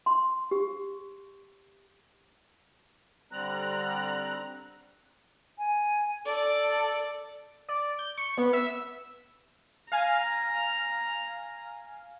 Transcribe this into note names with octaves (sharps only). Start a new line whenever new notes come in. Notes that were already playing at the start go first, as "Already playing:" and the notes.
C6
G4
D3 G3 C4 A#5 F#6
G#5
A4 D5
D5
G6
C#6
B3
E5
F5 G#5 A#5